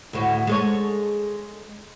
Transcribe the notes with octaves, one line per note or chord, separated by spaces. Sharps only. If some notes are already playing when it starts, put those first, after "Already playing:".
D2 A2 F#4
G#3 A4 C#5